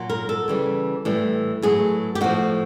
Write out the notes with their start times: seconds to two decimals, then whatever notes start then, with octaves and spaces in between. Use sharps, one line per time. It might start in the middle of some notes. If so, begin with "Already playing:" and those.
Already playing: A#2 F#3
0.10 A#4
0.29 A4
0.48 C#3 E3 G3
1.05 A2 E3 G3
1.62 A2 F#3 G#4
2.15 G4
2.21 A2 F3 F#4